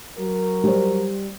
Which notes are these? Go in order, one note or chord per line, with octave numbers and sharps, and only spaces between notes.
F#3 A#4
G3 C5